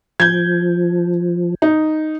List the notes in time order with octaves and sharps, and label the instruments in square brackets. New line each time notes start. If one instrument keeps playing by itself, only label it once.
[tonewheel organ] F3 [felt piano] G6 G#6
[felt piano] D#4